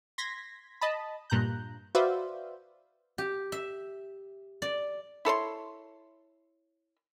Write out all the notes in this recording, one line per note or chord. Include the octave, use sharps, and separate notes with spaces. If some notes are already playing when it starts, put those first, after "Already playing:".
C6 G#6 A#6 B6
D#5 A5 B5
G2 A#2 A#5 F#6 G6
F#4 B4 C5 D5 E5 F5
G4
E5
D5
E4 A4 C#5 C6